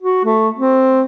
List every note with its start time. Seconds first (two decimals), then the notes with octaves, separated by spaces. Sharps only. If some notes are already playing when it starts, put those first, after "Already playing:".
0.02 F#4
0.25 A3
0.58 C4